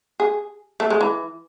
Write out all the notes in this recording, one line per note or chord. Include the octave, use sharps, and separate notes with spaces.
G#4
A3
G#3
E3